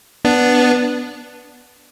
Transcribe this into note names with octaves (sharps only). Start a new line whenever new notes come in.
B3 D4